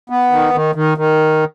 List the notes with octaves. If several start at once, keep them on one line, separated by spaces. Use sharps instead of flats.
B3
D#3
D#3
D#3
D#3